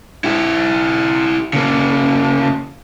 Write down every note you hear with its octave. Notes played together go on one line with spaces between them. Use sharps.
E4 G4
C#3 A#3